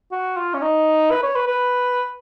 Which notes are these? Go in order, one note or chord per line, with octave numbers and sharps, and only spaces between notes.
F#4
F4
C#4
D#4
B4
C#5
B4
B4